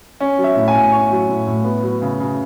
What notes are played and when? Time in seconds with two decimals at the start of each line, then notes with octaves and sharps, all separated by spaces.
0.20 C#4
0.38 F#3
0.44 E5
0.56 A2
0.68 G#5
0.74 A2
0.92 C#4 C#6
1.11 F#3
1.29 A2
1.47 A2
1.65 B3
1.83 F#3
2.02 C#3
2.20 C#3